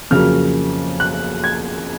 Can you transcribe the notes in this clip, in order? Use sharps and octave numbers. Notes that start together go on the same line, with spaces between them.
F2 C#3 F#3 A#3 F6
F#6
G#6